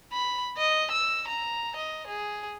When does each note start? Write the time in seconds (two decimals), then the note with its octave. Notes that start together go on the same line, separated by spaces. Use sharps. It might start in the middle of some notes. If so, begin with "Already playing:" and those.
0.12 B5
0.57 D#5
0.92 E6
1.28 A#5
1.76 D#5
2.07 G#4